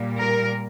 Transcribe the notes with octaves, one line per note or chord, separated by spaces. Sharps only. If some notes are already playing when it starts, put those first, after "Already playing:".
Already playing: A#2 G3 A#3
A#4